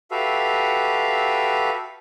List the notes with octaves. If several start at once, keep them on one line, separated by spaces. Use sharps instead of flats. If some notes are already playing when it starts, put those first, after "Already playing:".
F#4 G4 A4 B4 E5 F5